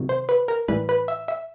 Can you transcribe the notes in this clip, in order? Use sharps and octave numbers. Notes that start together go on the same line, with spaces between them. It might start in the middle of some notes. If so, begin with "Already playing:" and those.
Already playing: C3 D#3 F#3
C5
B4
A#4
A2 E3 G3 B4
B4
E5
E5